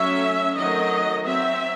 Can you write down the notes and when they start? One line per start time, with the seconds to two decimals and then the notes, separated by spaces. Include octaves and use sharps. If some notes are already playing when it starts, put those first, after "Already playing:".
Already playing: F#3 A3 C#4 E5
0.57 D#3 F#3 A3 C4 D#5
1.24 F#3 C4 E5